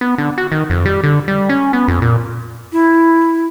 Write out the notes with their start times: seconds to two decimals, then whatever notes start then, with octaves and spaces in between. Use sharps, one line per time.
0.01 B3
0.18 D3
0.38 F#4
0.52 D#3
0.70 F2
0.86 G3
1.03 D3
1.28 G3
1.49 C#4
1.73 B3
1.88 F2
2.02 A#2
2.72 E4